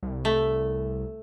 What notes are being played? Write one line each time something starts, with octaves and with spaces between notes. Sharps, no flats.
C2
A3